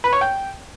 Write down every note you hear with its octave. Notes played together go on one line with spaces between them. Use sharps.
B4
C#5
G5